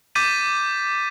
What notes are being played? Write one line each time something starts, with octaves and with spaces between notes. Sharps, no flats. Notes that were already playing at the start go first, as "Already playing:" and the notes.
D6 G6 A6 B6 D#7